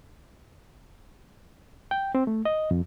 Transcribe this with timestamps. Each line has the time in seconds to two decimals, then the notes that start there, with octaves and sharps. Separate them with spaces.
1.91 G5
2.15 C4
2.27 A3
2.45 D#5
2.71 F2